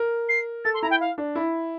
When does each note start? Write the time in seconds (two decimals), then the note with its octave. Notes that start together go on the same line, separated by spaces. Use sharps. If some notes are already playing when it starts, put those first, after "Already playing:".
Already playing: A#4
0.29 C7
0.64 A4 A6
0.74 C6
0.82 E4 A#5
0.90 G5
1.00 F5
1.18 D4
1.35 E4